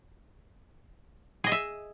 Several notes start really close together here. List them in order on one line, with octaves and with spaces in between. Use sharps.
G#4 D#5 G#5 E5